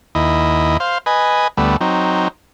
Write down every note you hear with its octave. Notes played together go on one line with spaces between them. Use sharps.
D#2 E4 D#5
C5 F5
B4 D#5 G#5
D2 G3 A3 B3
F#3 C4 D#4